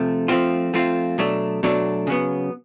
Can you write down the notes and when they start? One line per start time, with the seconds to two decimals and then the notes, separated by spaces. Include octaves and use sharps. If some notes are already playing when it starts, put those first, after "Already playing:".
Already playing: C3 F3 A3
0.28 F3 A3 C4 F4
0.74 F3 A3 C4 F4
1.18 B2 F#3 A3 D4
1.63 B2 F#3 A3 D4
2.07 C#3 F#3 B3